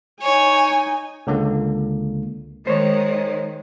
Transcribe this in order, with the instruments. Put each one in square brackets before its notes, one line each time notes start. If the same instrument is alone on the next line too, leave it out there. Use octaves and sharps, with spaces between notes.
[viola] D#4 G#5 [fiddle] C#5
[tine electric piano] C#2 D3 A#3
[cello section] D#3 G#3 [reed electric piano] C5 C#5